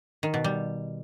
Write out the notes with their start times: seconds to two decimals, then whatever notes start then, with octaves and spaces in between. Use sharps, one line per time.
0.23 D#3
0.34 B2
0.44 G3